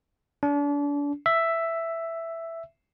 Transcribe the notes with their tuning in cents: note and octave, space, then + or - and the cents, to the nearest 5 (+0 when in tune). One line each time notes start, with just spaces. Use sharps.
D4 -35
E5 +5